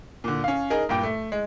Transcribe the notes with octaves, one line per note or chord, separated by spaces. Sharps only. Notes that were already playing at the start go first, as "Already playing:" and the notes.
A#2 D3
C#4 F5
D#4 G#4 A#4
G2 A#2 G5
A3
G#3